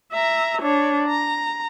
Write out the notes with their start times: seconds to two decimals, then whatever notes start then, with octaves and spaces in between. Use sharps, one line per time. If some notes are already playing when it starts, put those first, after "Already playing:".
0.13 E5 A#5
0.62 D4 C#5
1.08 A#5